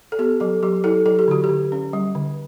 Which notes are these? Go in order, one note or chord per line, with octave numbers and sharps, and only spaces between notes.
A4
B3 G4
F#3 A4
F#3 G4
E4 A4
F#3 A4
G4
D3 F#4
G4
D3
C#4
G3
D3